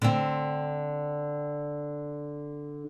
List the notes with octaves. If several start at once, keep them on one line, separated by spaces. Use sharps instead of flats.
D3 C4